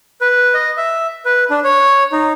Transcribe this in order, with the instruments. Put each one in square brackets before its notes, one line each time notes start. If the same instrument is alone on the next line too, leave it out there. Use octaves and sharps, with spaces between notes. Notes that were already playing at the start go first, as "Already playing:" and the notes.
[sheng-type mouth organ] B4
D#5
E5
B4
D4
C#5
D#4